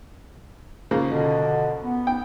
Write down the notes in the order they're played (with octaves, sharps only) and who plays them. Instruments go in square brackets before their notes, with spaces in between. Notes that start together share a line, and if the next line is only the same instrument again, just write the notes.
[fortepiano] C#3 F3 A#3
[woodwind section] B2 D3
B3
[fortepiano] G5